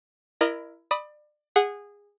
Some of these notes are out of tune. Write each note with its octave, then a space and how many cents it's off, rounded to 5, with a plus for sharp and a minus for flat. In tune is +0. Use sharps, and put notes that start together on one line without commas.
E4 +20 A#4 +10 D#5 -35
D5 +30 B5 -5 D#6 +15
G#4 -20 F#5 +0